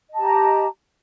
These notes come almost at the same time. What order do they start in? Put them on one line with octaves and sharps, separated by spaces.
D#5 A5 G4 A#5